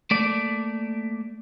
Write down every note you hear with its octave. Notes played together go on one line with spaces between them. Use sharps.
A3 A#3 D5